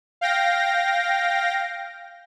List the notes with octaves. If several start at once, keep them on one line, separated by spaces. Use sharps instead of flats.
F5 G5 A#6